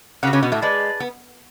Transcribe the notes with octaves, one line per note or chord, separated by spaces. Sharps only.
C#3 C#4 F#4 B4 F#5
C#3 C#4
B2 B3
A2 A3
G#3 G#4 B4 D5 A5
B3